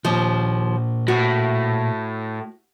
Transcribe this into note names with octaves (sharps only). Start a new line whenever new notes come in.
D#2 A#2 F3 C5
A2 F#4